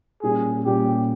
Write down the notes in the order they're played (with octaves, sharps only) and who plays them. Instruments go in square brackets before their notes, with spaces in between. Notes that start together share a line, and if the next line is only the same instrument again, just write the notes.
[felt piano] A#2 G3 C#4 [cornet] G#4
[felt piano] A#2 G3 C#4 [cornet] G4